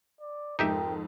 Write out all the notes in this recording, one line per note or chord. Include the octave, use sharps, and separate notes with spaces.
D5
F2 G#2 D#4 G4 A#4 E5 G5